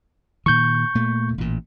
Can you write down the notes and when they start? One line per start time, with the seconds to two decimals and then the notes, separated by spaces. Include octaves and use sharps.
0.46 A#2 D#3 C#6 G6
0.95 A#2 A3
1.38 A1 A#2